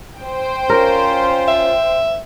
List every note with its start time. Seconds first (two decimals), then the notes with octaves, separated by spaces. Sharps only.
0.18 C5 G5
0.69 C#4 F4 A#4
1.48 E5